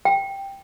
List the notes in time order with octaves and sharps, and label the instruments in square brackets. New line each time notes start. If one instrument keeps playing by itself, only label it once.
[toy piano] G5